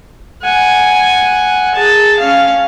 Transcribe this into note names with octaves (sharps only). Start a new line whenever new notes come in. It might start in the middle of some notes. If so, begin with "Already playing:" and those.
F#5 G#5
G#4 A5
C#4 F5